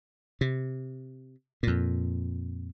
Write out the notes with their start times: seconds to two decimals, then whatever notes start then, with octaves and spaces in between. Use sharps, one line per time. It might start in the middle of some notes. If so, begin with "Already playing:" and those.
0.41 C3
1.63 F2 A#2